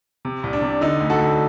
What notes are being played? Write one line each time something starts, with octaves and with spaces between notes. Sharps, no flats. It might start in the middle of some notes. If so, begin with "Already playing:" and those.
C3
C2
D4
C3
D3 D#4
D2
F#4 A4
D2